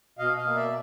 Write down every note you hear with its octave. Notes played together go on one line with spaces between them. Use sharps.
B2 D#5 F5
D#5 F5
A#3
D5 E5